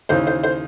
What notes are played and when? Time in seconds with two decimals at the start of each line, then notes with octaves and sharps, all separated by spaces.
0.09 D#2 C#3 E3 C5
0.27 C5
0.44 C5